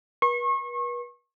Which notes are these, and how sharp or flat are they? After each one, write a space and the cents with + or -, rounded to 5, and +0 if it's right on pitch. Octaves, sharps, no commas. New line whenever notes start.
B4 -40 C#6 -35